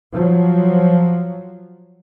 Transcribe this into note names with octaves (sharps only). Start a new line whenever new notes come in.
F3 F#3